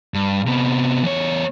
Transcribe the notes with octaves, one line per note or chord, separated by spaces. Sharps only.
G2
C3 B3
E2 C#5